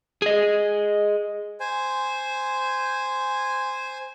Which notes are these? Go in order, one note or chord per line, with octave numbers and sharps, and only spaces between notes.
G#4 D#5
C5 G#5